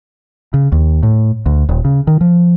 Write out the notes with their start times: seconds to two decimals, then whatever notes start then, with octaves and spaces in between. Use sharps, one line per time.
0.54 C#3
0.72 D#2
1.03 A2
1.46 D2
1.69 D#1
1.85 C#3
2.07 D#3
2.21 F3